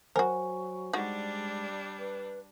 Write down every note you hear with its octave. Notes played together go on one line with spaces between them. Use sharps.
F#3 F#4 A#4 C5 G#5
G3 G#3 D4 D#4 F#4
B4